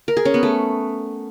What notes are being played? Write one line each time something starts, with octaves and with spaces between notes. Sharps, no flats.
A#4
G#4
C#4
B3
A3